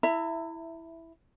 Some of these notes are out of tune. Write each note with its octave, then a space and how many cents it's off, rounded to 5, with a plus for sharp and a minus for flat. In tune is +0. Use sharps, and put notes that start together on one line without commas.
E4 +0 E5 +10 A#5 -40